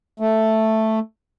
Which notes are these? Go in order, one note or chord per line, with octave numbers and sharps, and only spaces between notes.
A3